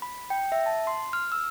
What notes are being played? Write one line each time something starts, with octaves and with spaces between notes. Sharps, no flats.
B5
G5
E5
A5
C6
F6
E6